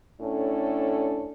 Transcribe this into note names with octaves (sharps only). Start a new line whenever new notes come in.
A2 C#4 D4 A4